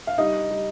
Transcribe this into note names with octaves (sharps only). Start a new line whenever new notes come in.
F5
G3 D#4 D#5
G3